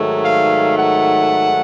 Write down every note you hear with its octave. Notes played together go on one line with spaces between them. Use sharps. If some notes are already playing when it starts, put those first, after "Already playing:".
Already playing: G#2 D#3 F#3 A3
F5
F#5